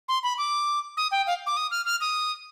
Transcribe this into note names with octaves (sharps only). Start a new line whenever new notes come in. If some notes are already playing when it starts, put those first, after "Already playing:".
C6
B5
D6
D#6
G5
F5
D6
D#6
F6
F6
D#6